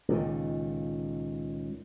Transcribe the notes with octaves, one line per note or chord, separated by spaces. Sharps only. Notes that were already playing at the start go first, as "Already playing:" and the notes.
C#2 A#2 D#3